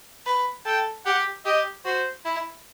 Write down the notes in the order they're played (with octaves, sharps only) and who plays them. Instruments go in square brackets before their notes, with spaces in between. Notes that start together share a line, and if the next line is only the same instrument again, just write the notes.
[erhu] B4
[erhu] A4 [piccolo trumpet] G5
[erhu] G4 [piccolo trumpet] F#5
[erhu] G4 [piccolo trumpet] D#5
[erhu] F#4 [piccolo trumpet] C5
[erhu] E4